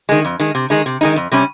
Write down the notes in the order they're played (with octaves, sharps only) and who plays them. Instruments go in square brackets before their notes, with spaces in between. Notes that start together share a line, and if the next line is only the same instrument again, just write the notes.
[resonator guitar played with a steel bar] D#3 G#3
F2
D#3 G#3
C3
D#3 G#3 D#4
C3
D#3 G#3 D#4
F2
C3 G3 C#4